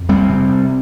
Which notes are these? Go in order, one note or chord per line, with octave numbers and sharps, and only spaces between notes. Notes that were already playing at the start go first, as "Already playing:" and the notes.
Already playing: F2
G3 C4
C3